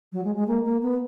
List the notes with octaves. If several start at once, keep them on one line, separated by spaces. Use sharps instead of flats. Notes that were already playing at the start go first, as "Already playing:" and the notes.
F#3
G#3
G#3
A#3
A#3
B3